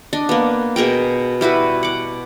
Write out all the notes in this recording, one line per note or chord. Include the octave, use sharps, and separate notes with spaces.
D4 D#5
A#3 B3
B2 G#4 A#4 G5
G3 E4 F#4 B4
F#5 D6